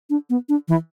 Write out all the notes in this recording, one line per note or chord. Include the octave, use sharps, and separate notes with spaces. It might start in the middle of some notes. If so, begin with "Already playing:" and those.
D4
B3
D4
E3